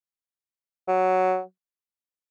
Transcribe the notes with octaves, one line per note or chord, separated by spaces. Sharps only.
F#3